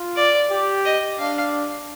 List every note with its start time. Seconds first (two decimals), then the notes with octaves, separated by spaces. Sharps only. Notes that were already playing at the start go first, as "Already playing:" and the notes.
Already playing: F4
0.16 D5
0.51 G4
0.85 D#5
1.19 D4 F5